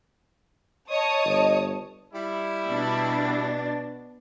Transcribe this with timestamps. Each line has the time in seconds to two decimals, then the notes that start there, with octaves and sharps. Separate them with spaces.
0.91 C#5 D#5 A5 D#6
1.25 G1
2.13 G3 E4
2.68 B2 D4